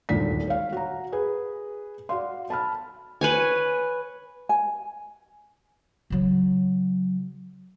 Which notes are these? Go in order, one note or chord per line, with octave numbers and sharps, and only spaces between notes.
D#1 G#1 D2 A#2 B6
C#5 F5
F#4 A#5
G#4 B4
F#4 D5 F5 C6
A5 B5 F6
B4 C#5 G#5
G#5
C#3 F#3